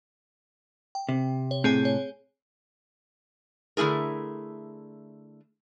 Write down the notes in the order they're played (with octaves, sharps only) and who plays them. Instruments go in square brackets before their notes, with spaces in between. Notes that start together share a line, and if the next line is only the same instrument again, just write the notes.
[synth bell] G5
[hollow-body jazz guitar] C3
[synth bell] C#5
[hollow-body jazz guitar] A2 C3 [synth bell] C4 G#4 G#5
[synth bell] C#5
[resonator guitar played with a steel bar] D3 A3 E4 G#4 A#4